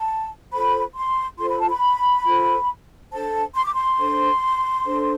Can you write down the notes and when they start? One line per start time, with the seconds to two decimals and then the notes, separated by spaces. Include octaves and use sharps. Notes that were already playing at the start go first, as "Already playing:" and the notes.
Already playing: A5
0.52 F4 A4 C5 B5
0.95 C6
1.39 F4 A4 C5 C6
1.49 B5
1.60 A5
1.70 B5
2.25 F4 A4 C5
3.12 D4 A4 C5 A5
3.55 C6
3.65 D6
3.75 C6
3.98 D4 A4 C5
4.85 D4 A4 C5